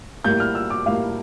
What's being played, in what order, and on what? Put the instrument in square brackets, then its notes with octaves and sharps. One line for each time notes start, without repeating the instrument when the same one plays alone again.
[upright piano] A2 G3 A#3 G6
F6
E6
D6
A2 G3 A#3 F5